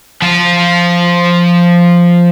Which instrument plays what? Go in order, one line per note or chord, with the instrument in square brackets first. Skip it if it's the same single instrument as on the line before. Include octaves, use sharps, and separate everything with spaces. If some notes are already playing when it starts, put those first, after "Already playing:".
[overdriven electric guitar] F3 F4